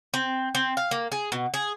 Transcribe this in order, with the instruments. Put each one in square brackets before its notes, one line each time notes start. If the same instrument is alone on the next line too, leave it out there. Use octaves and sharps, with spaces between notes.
[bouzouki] C4
C4
F5
A#3
G#4
B2
G#4